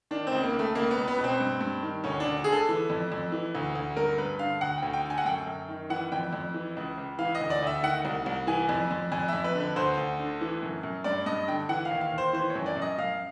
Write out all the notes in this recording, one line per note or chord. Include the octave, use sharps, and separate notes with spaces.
D#3 D4
C4
C#2
A#3
C#2
A3
C#2 A#3
B3
C#2
B3
B2
C4
G2
G2
D#3
D2 C#4
D2 D4
D3 G#4
A4
E3
F2
F2
E3
D2
D2
G2 A#4
G2 B4
D3 F5
D2 F#5
D2 G5
G5
D3
G#5
F#5
F#2 G5
F#2
D#3
E3 F#5
F2 G5
F2
E3
C#2
C#2
E3 F5
D#5
D2
D5
D2 E5
D#3 F#5
C2
C2
E3 G#5
F2
F2
F2 G#5
F2 E5
B4
D3
B4
D2 C5
D2
D3
E3
F#2
F#2
G2 D5
G2 D#5
D3 G5
E3 F#5
F5
D#2
F5
D#2
C5
E3 C5
C#5
F#2
D5
F#2
D#5
F#2 F5